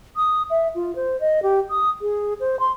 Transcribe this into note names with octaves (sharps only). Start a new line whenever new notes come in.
D#6
E5
F4
C5
D#5
G4
D#6
G#4
C5
C6